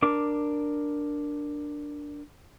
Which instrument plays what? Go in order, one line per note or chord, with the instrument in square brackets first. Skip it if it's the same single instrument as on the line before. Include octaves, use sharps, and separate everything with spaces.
[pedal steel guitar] D4 A#4 D6